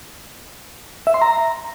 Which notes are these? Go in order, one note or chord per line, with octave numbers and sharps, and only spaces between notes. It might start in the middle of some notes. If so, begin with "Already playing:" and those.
E5
C6
A#5